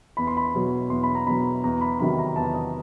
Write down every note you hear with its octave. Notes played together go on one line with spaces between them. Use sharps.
E2 B5
C6
B5
B2 F#3
E2 C6
B5
A#5
B2 F#3 B5
E2 A#5
B5
C3 D#3 F#3 B5
A#5
E2 A5
D#5